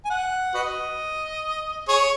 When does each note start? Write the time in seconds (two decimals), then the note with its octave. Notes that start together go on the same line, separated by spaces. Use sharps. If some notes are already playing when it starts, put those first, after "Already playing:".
0.05 G#5
0.10 F#5
0.54 F#4 B4 D#5
1.88 G#4 C#5